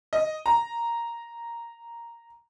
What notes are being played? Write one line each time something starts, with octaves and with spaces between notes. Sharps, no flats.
D#5
A#5